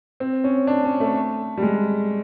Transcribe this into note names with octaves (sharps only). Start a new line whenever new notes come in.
C4
C#4
D4
C#4
A3
G3
G#3